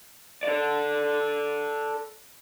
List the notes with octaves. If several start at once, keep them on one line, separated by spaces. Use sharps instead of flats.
A4 D5